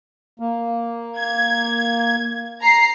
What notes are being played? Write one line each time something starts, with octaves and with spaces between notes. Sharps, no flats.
A#3
G#6
A#5 C7